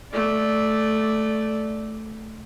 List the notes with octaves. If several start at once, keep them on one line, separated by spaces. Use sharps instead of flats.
A3 D5